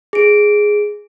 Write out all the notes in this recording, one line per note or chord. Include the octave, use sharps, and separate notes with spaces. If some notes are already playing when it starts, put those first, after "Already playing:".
G#4 D7